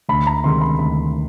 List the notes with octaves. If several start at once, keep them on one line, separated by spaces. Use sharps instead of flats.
D2 B5
A#5
C3 D#3 G#3 C6
B5
D2 B5